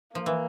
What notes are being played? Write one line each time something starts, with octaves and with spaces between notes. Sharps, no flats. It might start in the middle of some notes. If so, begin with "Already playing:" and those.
F3 A#3
E3